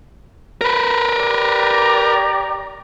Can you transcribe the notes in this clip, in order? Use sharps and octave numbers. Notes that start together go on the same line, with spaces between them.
A#4 B4
G4 D5 A#5